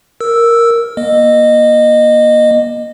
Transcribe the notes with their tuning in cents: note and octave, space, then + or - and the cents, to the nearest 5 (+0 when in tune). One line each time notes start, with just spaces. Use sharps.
A#4 +0 E6 +0
A#3 +25 D#5 -15